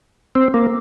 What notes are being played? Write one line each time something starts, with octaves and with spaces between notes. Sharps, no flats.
C4
A#3